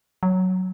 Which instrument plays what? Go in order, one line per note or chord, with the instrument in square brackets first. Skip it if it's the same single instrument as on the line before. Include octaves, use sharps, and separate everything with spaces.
[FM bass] F#3